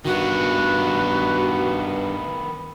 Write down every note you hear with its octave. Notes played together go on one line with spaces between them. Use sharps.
G2 D#3 B3 F#4